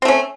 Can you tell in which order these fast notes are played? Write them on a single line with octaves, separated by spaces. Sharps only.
C4 A3 C#4